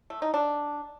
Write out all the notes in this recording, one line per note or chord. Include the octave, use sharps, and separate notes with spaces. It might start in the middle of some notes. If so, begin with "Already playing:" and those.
A3
D#4
D4